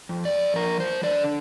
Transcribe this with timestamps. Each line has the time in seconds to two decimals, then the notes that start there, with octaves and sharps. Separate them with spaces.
0.09 F2
0.25 D5
0.56 F3 A#4
0.80 C5
1.03 D3 D5